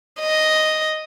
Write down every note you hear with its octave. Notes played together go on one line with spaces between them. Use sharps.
D#5